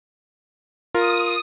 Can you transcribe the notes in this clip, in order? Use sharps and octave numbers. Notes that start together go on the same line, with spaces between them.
F4 A#4 D#6